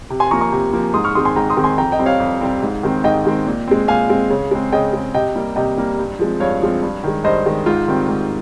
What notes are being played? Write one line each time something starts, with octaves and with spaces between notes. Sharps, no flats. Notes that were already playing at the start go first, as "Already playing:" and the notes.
C3
G#5 C6
F3 A#3 A#5 C#6
A#5 C#6
C3
F3 A#3
G#2 C6 D#6
C#6 F6
D#3 G#3 C4 C6 D#6
G#5 C6
G#2 G5 A#5
C6 D#6
D#3 G#3 C4
G#5 C6
F2 G5 A#5
D#5 G5
C3 G3 C4
C#5 F5
F2
C3 G3 C4
G#2
D#3 G#3 C4
G#2 D#5 G5
D#3 G#3 C4
A#2
G#3 C4
A#2 F5 G#5
G#3 C4
C#3
G#3 C4
C#3 D#5 G5
G#3 C4
C3 D#5 G5
G3 A#3
C3 D#5 G5
G3 A#3
G2
F3 G#3 C4
G2 C#5 F5
F3 G#3 C4
G2
D#3 G#3
G2 C5 D#5
D#3 G#3
G#2 F4
D#3 G3 C4
G#2